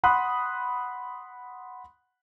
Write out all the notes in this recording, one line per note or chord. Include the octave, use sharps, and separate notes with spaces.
F#5 B5 C6 D#6 F#6